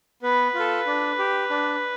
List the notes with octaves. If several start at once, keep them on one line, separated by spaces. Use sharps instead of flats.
B3 B4
F4
A4
D4
G4
D4